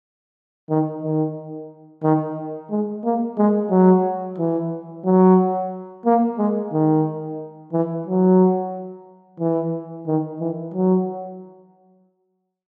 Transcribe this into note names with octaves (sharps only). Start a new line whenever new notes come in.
D#3
D#3
D#3
G#3
A#3
G#3
F#3
E3
F#3
A#3
G#3
D#3
E3
F#3
E3
D#3
E3
F#3